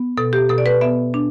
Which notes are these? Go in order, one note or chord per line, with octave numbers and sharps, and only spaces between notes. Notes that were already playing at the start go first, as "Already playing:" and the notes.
Already playing: B3
B2 A4
G4
B2 A4
D5
B4
B3 E5
D4